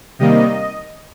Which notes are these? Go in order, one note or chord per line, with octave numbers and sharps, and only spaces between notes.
C3 D#3 G3 A#3 D#5